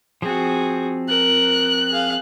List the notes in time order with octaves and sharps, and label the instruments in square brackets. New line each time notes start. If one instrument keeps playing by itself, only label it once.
[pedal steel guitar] F3 C4 [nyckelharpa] F#4 G#4
[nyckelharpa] A#4 [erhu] F#6
[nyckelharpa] G#4 F5